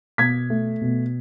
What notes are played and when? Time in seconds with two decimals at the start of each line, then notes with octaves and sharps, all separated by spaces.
0.18 B2 G#6 B6
0.50 A3
0.81 B2